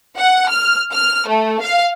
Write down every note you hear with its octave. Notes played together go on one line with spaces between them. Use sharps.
F#5
F6
F6
A3
F5